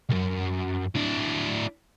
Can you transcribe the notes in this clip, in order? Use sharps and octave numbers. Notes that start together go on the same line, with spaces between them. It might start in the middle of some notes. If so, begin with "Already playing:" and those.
C2 F#2
D4 E4